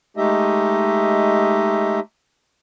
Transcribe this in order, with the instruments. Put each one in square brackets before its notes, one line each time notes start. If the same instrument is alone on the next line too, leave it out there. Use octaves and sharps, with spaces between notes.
[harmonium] G#3 A3 D#4 G4 D#5 E5